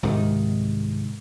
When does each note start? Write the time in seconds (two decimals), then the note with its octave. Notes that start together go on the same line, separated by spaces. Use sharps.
0.03 C2 G#2 C3 D#3